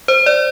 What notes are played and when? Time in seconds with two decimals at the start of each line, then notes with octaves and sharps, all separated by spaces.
0.08 C5
0.26 D5